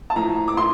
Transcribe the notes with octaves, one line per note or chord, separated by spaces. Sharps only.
A5
A2 F3 A#5
D6
A2 C6